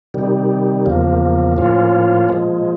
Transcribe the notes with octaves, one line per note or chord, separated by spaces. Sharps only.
C3 D#3 G3
E2 C#3 F3 A#3
A2 F3 A#3 C#4 F4
A#2 F3 G#3